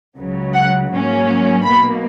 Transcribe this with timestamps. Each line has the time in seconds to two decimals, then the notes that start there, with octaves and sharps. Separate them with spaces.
0.16 C#2 C#3 F#3
0.54 F#5
0.91 G#2 F#3 A#3 C#4
1.64 B1 B2 A#3 B5